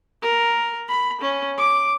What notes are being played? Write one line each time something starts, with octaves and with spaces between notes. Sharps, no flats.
A#4
B5
C#4
D6